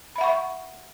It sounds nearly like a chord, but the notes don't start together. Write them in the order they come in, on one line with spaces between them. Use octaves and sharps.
B5 E5 F#5 C#6